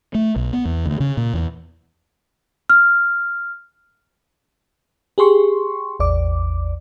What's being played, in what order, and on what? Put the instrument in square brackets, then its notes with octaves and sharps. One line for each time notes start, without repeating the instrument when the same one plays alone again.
[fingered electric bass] A3
B1
B3
E2
D2
C#3
A#2
E2
[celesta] F6
[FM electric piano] G4 G#4 C6 C#6
A1 E2 D5 D6